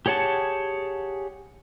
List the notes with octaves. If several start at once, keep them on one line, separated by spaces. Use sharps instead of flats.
G4 G#4 C#5 F#5 A5